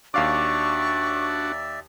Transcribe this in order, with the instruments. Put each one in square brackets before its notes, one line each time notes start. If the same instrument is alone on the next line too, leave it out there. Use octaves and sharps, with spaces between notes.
[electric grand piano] D#2 F5 D6 [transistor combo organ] D4 F#4 [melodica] D5 E5 [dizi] C#6